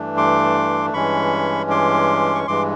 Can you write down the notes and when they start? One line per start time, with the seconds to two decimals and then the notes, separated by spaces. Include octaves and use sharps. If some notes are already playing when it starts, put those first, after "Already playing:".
Already playing: G2 E3 A3 D4
0.17 C6 D6
0.93 G2 E3 G#3 C#4 B5 C#6
1.70 C6 D6
2.35 C#6
2.47 G2 E3 G#3 C6 D6